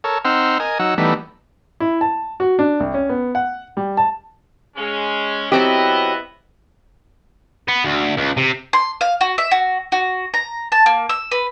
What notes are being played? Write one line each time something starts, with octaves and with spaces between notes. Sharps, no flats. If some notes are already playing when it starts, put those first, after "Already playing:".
A4 A#4 C#5
C4 D#4 C5 F#5 E6 F6
A#4 D#5 G#5
F#3 D#4 F#5 E6
E3 G3 A3 B3 D#4
E4
A5
F#4
D4
C2
C#4
B3
F#5
G3
A5
G#3 C#4
F#3 B3 C4 E4 G4 D#5
B3
D2
C#2
C3
C6
F5
F#4
E5
F#4
F#4
A#5
A5
A#3
E6
B4